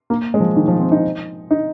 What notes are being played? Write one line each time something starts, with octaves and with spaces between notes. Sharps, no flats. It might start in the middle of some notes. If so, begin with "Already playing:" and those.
A#3
G#3
F3
D#3
F3
C4
D#4
D#4